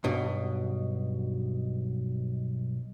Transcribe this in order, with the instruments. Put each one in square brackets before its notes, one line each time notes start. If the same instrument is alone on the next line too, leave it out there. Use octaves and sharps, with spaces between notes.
[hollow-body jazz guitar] B1 G2 B2